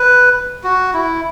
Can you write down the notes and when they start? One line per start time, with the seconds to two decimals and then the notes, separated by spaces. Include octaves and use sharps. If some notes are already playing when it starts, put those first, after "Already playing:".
Already playing: B4
0.64 F#4
0.94 E4